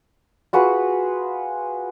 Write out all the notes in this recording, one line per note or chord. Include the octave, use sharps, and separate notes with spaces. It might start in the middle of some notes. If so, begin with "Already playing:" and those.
F4 F#4 G#4 B4